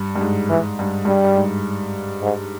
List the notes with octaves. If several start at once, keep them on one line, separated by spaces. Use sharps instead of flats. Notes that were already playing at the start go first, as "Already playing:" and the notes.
Already playing: G2
G2
G#2
E3
G2
G2 G3
G2
G#2
G#2